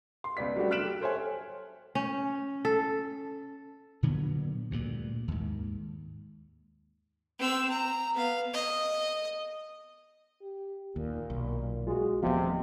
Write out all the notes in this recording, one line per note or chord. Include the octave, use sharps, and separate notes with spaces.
C6
C#2 B3 D5 B6
F#3 G3 A3 D4 F#4 G4
F6 F#6 B6 D7 E7 F#7
G4
A4 C5 C#5 E5 G#5
C#4
A4
A#2 D3 F#3 B3
D2 G2 A#2
D#2 G#2
C4 E6
A#5
B3 F5
D#5
G4
D#2 A#2
B1
G#3 F4 F#4
D#1 D2 C3 F3 B3 D#5 F5